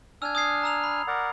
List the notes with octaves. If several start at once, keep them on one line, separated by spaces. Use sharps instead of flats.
D4 G#5 E6 F6 G#6
D#6 G#6 C7
A#5 E6 F7
B5
A#4 D5 F#5